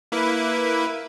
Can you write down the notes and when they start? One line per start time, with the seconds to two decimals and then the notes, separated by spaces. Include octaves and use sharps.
0.12 A#3 E4 B4